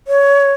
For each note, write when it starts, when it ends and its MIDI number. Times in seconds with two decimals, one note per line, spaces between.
0.08 0.53 73